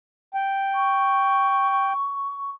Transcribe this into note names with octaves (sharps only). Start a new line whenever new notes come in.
G5
C#6